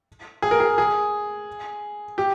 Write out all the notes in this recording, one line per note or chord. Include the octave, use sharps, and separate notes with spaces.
G#4
A#4
G#4
G#4
G4